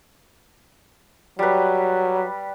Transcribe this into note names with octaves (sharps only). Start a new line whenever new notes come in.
F#3 G3 B4